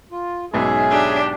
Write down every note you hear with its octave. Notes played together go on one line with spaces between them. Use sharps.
F4
B1 G#2 C#4 G#4 E5 G#5
D4 G4